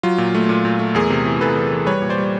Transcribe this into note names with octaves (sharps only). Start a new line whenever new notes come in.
F#3 F4
A#2
A3
A#2
A#2
A3
E2 G#4 A#4
C3
E3
E2 A4 B4
E2
E3
G3 B4 C#5
A#2
C5 D5
G3